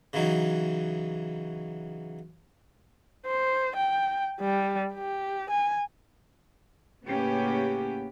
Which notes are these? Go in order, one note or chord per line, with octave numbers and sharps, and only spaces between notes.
C#3 E3 F#3 D#4
C5
G5
G3
G4
G#5
A2 C#3 A#3 B3 C#4 G4